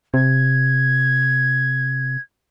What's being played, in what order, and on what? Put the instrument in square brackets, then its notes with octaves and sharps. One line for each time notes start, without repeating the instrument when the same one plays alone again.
[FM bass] C3 [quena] G#6